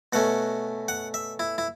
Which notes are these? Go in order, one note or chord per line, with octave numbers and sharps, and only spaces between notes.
B2 A3 C#4 F#5
F#5
E5
E4
E4